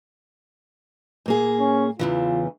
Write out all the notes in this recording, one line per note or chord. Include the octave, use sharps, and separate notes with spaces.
A#2 A#3 G#4
C#4
E2 C#3 E3 F4